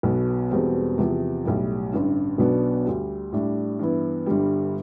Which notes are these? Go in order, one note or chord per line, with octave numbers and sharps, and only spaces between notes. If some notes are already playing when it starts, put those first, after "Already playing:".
B1 B2 B3
E1 E2 B2 G3 C4
E2 C3 F3
B1 A2 G3
A1 G2 D3
B1 B2 B3 D4
D2 D3 G3
A2 G3 D4
G2 E3 B3 E4
G1 G2 D3 G3